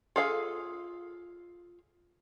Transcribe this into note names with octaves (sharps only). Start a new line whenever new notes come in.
F4 G#4 A4 F5